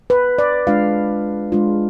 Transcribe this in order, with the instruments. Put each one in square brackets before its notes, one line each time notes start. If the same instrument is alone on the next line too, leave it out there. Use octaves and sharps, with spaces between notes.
[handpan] B4
D5
G#3 D4 F4 F5
G#3 D4 F4